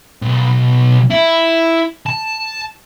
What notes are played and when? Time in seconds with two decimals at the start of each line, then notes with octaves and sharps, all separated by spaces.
0.22 B1
1.10 E4
2.06 A5